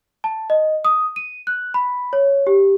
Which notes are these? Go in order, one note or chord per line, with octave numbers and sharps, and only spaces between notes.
A5
D#5
D#6
D#7
F#6
B5
C#5
G4